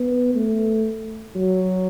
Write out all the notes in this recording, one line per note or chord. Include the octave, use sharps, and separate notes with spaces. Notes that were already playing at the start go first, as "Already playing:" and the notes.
Already playing: B3
A3
F#3